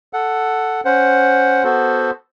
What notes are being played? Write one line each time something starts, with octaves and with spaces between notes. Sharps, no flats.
A4 F#5
C#4 C5 F#5
B3 F#4 A4 C5